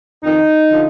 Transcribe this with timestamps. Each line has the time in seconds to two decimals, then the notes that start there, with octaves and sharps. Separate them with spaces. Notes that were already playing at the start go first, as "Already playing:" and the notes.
0.24 F2 D#3 D#4
0.72 D3 F3